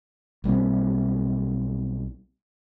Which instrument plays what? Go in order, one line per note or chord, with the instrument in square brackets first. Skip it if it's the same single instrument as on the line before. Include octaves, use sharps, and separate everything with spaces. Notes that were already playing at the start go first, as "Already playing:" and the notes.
[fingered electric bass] B1 G3 A#3 C4